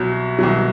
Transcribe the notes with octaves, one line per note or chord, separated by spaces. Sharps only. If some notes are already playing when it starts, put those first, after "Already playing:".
Already playing: C2 B2 F#3
C2 B2 F#3